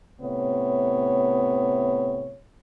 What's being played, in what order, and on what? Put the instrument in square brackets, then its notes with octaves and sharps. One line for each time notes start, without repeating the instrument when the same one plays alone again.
[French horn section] A2 C3 B3 C#5